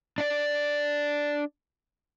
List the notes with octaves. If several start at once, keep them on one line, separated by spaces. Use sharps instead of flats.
D4 D5